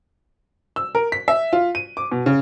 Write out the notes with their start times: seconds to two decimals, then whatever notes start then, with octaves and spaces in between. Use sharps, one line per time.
0.76 E6
0.95 A#4
1.12 B6
1.28 E5
1.53 F4
1.75 D#7
1.97 D6
2.12 B2
2.26 C#3